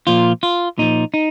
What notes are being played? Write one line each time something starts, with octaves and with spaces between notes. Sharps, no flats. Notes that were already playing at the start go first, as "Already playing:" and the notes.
A#2 F3 F4
F4
A#2 F3 D#4
D#4